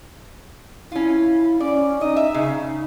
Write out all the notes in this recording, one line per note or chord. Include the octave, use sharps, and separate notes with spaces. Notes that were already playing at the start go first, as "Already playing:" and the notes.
C#4 E4 F4
C#4 D5
D#4 D#5
E5
C#3